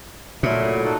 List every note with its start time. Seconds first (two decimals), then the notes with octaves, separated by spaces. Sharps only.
0.43 A#2 F#3 A3 E4
0.84 D#4 F#4 A4